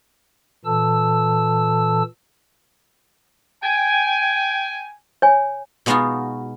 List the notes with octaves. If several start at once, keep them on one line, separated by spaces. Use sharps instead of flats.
A#2 E3 A4 A5 E6
G5 G#5
C#5 G#5
B2 G#3 B3 D#4 F4 F#4